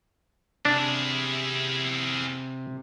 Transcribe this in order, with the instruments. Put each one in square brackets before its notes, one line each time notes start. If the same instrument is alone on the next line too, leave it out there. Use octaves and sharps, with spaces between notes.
[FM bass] C3 [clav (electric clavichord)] D4 [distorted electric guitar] E4 G#4